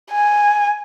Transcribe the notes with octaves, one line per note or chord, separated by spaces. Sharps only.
G#5